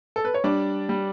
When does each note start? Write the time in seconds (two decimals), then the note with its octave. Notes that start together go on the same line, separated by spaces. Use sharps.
0.16 A4
0.25 B4
0.34 C#5
0.44 G3 D4 D5
0.89 G3